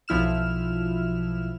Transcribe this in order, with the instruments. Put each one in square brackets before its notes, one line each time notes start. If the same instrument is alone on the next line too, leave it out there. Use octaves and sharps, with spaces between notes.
[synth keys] B1 F3 E4 F6 E7